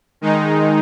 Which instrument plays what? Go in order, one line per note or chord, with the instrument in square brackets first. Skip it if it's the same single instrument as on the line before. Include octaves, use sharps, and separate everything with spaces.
[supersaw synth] D#3 G#3 D#4